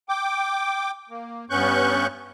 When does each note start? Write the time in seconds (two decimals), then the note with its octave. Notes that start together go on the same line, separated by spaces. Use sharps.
0.09 G5 D6
1.10 A#3
1.50 G2 B3 C#4 C#6 F#6 G6